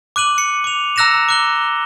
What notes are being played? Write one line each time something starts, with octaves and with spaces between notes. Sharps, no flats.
D6 F#6 D#7 F#7
C#7
D6 F7
A#5 E6 F#6 A#6 C#7 E7
D6 F#6 G7